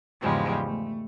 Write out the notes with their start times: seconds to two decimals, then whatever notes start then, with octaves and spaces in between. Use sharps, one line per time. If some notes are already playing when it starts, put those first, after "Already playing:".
0.21 E2 G#2 C#3 F3 G3 G#3
0.65 A3